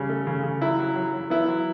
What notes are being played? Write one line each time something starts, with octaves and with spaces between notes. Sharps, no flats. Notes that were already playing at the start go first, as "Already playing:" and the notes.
Already playing: C#3 G3
A3
C#3
C#3
F#3 E4
F#3
F#3
F#3
B3 E4
F#3